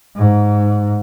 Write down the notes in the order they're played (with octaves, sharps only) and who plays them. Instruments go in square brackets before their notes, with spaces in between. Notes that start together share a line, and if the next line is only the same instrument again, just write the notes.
[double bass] G#2